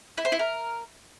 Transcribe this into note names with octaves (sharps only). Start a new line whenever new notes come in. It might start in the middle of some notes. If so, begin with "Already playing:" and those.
E4
C5
E4
A#4